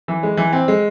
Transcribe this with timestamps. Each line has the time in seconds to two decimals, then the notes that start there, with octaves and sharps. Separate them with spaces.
0.08 E3
0.23 G#3
0.37 E3
0.53 C4
0.68 G#3